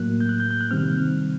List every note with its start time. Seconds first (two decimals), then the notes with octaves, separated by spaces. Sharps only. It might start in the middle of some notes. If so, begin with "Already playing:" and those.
Already playing: A2 F#3 A#3 F#6
0.21 G6
0.29 F#6
0.40 G6
0.51 G6
0.61 F#6
0.71 C3 D#3 G3 C4 F6